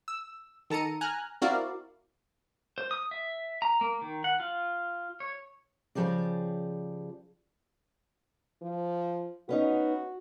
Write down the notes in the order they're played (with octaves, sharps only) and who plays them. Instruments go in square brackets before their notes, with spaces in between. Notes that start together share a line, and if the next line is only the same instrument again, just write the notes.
[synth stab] E6
D#3 A4 A#5 C#7 D#7
G#5 A#5 F6 F#6
C4 E4 F#4 A#4 D5 F5
[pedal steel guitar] C5
D#6
E5
A#5
A#3
D#3
F#5
F4
C#5
[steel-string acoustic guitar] C#3 E3 F3 G4 G#4 D5
[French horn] F3
[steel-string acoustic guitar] B3 C#4 D#4 [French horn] F#4